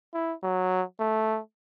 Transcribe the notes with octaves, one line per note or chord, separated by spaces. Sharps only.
E4
F#3
A3